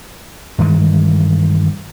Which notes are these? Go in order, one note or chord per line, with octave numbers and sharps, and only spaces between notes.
G2 D#3 E3 G#3